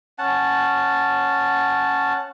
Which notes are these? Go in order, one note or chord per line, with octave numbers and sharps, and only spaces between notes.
C#4 F#5 A5